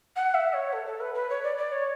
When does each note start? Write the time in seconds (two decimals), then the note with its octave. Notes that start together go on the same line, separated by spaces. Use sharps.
0.16 F#5
0.34 E5
0.53 C#5
0.73 A4
0.86 A4
1.00 B4
1.14 B4
1.30 C#5
1.43 D5
1.57 D5
1.72 C#5